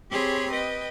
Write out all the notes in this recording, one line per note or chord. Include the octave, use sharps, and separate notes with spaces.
C4 G4 G#4 C#5 B5 C6
B4 D#5 G5